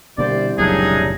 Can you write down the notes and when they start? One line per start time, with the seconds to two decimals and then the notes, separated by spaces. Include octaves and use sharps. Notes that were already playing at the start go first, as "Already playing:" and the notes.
0.18 C2 B2 D3 G3 A#3 C5 D5
0.58 F1 C#2 A#2 F#3 D4 D#4 G#4